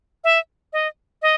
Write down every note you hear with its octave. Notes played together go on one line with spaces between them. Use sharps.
E5
D#5
D#5